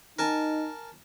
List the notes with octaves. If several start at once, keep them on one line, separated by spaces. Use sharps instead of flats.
D#4 A#4 G#5 A5